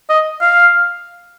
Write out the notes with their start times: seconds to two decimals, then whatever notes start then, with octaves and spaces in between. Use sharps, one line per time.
0.10 D#5
0.41 F5